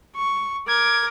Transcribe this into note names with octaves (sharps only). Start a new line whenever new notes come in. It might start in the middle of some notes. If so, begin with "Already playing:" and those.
C#6
A#4 D6 G#6